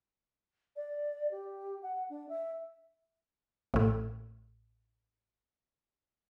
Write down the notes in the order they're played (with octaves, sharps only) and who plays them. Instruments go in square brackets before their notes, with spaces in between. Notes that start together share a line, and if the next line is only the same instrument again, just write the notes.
[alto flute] D5
G4
F#5
D4
E5
[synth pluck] A1 A2